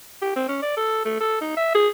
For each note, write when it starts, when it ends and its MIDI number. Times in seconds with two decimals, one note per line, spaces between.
0.22 0.35 67
0.36 0.43 60
0.48 0.59 61
0.62 0.74 74
0.77 1.04 69
1.05 1.19 57
1.21 1.38 69
1.41 1.53 63
1.57 1.74 76
1.75 1.88 68